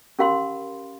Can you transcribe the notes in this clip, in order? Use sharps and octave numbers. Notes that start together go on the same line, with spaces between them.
C#4 G4 A#4 F5 B5 C6